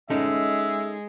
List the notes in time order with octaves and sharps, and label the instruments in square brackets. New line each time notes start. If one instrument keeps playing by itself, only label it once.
[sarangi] G#3 [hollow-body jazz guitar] C#4 D#4 A4 [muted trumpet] E5